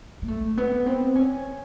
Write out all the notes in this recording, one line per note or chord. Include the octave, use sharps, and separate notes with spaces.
A#3
A3
B3
C4
C#4